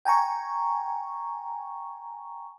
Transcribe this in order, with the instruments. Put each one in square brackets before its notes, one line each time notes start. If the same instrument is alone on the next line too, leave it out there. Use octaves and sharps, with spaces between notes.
[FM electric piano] G5 G#5 A#5 C#6